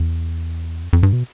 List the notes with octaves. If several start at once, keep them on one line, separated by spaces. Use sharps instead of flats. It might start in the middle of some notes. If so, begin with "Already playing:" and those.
Already playing: E2
F2
F2
G2
B2